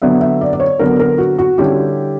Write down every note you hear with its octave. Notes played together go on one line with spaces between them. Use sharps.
D3 F#3 B3 E5
E5
D5
D5
C#5
D3 F#3 B3 A#4
A#4
F#4
F#4
D3 G3 C#4 E4 G4